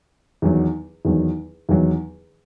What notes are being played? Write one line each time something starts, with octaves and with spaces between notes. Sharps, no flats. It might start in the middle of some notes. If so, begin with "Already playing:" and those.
E2 D#3 F#3
E2 D#3 F#3
E2 D#3 F#3